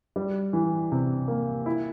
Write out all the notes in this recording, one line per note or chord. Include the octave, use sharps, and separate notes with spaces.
G3
E3
C3
A#3
E4